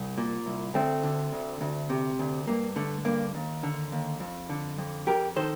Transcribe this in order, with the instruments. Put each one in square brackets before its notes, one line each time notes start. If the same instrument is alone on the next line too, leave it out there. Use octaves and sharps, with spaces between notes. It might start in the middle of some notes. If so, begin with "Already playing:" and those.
Already playing: [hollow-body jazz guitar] C2
A#2
C2
D2 A3 C4
D3
D2
D2
C3
D2
G2 A#3
D3 A3
G2 A#3
D#2
D3
D#2
F2
D3
F2
F2 G4 A#4
D#3 A4 C5